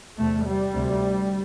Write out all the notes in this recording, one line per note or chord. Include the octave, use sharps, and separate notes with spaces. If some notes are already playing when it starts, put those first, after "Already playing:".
E2 C3 A3
G3
D2 C3